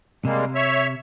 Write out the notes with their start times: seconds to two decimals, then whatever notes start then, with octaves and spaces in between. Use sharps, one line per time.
0.25 C3 G3 G#3 A#3
0.55 C#5 E5